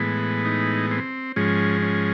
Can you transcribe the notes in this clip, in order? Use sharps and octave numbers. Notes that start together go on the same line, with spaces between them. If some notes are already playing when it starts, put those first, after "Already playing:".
Already playing: A2 E3 G#3 B3
D#4
C4
G#2 F3 G#3 C#4
C#4